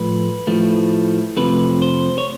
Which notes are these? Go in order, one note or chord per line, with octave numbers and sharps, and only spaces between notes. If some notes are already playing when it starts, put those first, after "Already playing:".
Already playing: A2 F3 A3 B4
A2 F3 A3
F2 C3 F3 A3 B4
C5
C#5